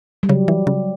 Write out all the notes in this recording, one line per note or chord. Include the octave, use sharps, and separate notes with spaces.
G3
C#3 F#3
E3
C#3